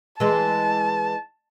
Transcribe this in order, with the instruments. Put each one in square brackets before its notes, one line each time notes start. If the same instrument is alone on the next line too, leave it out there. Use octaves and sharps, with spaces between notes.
[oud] E3 G#3 [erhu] A5